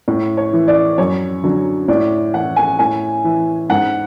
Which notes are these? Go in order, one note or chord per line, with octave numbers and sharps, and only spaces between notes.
A2
C#5
E3
D5
F#2 C#5
D3 F#3
A2 D5
E3 F#5
G#5
A2 G#5
E3
G#2 F#5